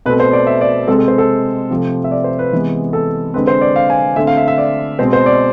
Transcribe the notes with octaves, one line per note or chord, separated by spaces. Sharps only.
B2 A3 C4 B4
C5
D5
E5
D5
C3 G#3 C4 A4
A4
C5
A4
C3 F3 A3
E5
D5
C5
B4
C3 E3 G#3 B3
A4
D3 G#3 C4 B4
C5
D5
F5
G#5
D3 A3 C4 E5
F5
E5
E5
D5
B2 G#3 C4 C5
C5
D5